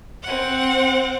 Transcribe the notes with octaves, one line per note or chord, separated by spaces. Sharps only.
C4 F#5